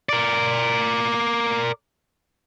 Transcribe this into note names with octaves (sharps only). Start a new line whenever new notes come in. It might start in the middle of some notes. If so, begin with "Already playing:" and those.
A#4 D5